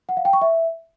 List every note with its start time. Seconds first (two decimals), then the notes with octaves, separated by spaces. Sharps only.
0.09 F#5
0.17 F5
0.25 G5
0.33 C#6
0.42 E5